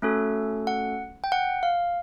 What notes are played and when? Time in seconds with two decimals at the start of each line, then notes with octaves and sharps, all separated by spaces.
0.02 A3 C#4 F#4 A4
0.67 F#5
1.24 G5
1.32 F#5
1.63 F5